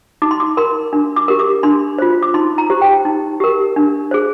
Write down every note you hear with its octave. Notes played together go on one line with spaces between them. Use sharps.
D#4 D6
C6
D6
A#4 C6
D4
D6
G4 A#4
D6
D4 C6
F4 C5
D6
D#4 C6
A#5
G4 C5
G5
D#4
G4 A#4
D4
G#4 C5